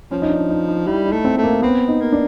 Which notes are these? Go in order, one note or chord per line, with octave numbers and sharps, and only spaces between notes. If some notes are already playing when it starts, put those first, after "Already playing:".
F3 C#4
D#4
D4
D#4
D#4
G3 E4
D#4
A3
C4
A3
A#3
B3 C4
D#4
A#3
D4